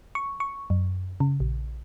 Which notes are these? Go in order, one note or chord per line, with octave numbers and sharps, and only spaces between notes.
C#6
C#6
F#2
C#3
A#1